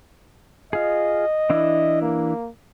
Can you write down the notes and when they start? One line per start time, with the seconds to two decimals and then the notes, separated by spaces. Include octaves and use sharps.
0.73 F4 G#4 D#5
1.50 E3 D4 E4
2.02 A#3